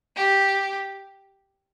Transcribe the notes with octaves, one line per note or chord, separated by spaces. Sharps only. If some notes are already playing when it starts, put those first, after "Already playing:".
G4